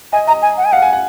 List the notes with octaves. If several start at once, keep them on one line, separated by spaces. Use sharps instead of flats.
D#5 G#5
D#5 A#5
G#5
F#5
G#5
F5 F#5
G#5
F#5